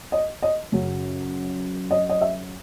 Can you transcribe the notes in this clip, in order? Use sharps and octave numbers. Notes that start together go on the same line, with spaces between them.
D#5
D#5
F#2 C#3 F#3 C#4
D#5
D#5
E5